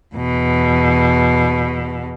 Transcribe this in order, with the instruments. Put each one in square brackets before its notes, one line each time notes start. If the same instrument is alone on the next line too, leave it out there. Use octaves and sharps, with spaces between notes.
[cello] E2 B2